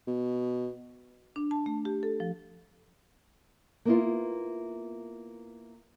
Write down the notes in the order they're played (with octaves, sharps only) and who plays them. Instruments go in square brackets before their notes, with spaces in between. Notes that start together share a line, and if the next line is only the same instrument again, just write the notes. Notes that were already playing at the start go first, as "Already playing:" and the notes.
[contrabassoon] B2
[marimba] D4
A5
A3
G4
A4
F3
[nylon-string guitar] A#3 B3 E4 F4